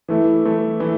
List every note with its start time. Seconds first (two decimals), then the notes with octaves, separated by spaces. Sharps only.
0.09 E3 A3 E4
0.45 E3 A3 E4
0.80 E3 A3 E4